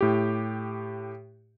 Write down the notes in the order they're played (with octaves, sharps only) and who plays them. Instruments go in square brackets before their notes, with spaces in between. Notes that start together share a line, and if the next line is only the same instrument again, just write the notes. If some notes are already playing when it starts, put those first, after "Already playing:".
[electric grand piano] A2 G4